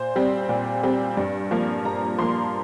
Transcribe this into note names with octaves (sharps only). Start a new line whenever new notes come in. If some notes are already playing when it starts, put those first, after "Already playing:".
Already playing: A#2 C5
G3 C4
A#2
G3 C4
G2
F3 A#3
G2 A#5
F3 A#3 C6